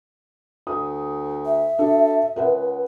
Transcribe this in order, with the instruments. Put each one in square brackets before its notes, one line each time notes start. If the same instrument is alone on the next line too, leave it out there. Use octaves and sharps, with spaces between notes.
[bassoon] D2 [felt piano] D#6
[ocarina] E5
[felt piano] D4 F#4 [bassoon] A4
[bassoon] C#2 [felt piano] A#4 B4 F#5